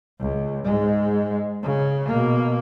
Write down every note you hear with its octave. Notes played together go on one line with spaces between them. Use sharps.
C#2
G#2 G#3
C#3
B2 A#3